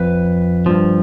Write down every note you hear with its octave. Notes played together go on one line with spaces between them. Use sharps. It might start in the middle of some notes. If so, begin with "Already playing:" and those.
Already playing: F2 B4
G2 F3